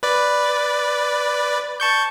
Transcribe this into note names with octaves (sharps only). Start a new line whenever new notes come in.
B4 D5
A5 C#6 G6